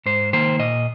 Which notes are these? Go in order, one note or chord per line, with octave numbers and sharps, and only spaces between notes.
G#2 C5
D#3 A#3 C5
A#2 D#5